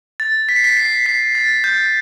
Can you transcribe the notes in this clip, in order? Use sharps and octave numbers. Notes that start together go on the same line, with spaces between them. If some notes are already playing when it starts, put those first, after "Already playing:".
A6
B6
C7
B6
C7
B6
A6
G6